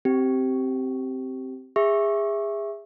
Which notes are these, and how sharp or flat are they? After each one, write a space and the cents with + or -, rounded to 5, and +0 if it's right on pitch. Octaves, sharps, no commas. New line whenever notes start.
C4 +0 G4 -15
G#4 -25 E5 +0 C#6 -15